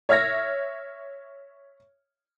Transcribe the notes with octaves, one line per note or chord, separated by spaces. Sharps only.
C#5 E5 F6 G#6 A#6